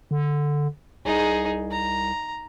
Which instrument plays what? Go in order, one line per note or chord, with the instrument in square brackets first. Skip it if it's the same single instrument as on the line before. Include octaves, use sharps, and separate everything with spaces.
[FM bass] D3
[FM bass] C2 [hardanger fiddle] D#4 G#4
[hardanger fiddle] A#5